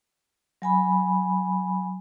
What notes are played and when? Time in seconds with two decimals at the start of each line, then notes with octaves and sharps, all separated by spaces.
0.62 F#3 G#5 B5